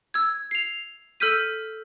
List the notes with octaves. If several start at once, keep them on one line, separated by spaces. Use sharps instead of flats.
E6 G#6
C7 F7
A4 E6 F6 G6 B6 D#7